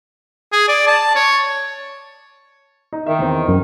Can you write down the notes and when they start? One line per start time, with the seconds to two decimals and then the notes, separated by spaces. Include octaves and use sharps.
0.52 G#4
0.68 D5
0.87 A5
1.15 C#5
2.93 D#4
3.07 D#3 E5
3.19 E2 C4
3.48 F#2